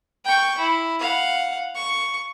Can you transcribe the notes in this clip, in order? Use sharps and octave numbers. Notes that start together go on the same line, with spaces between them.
G5 C#6
E4
F5 F#5
C#6